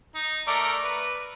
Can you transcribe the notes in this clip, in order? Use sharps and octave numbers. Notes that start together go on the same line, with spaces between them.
D#4
A3 A#4 D5
B4